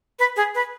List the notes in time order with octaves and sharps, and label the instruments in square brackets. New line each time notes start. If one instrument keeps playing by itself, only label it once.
[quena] B4
G#4
B4